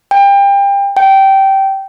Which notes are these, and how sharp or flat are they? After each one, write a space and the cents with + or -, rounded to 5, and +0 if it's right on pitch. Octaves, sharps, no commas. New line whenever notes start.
G5 +30
G5 -15